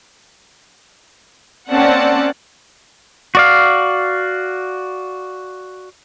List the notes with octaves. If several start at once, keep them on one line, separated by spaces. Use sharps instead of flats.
A#3 C4 C#4 D5 F#5 A5
F#4 D5 F5